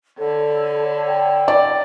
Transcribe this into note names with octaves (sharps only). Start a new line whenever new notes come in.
D3 A4 C#5 A5 B5
G5
D5